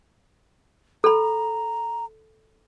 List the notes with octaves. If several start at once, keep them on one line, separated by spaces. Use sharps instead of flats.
A4 A#5 B5